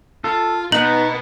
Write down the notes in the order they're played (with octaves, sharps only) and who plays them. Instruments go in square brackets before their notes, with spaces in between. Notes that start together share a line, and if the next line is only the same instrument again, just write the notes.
[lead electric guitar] F4 [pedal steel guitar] A4
[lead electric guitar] B2 [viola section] B3 [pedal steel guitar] D#4 F#5 [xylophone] F#7